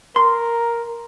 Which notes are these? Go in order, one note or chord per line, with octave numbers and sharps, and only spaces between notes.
A#4 C6